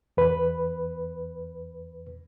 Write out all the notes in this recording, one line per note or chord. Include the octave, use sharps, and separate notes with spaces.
E2 B4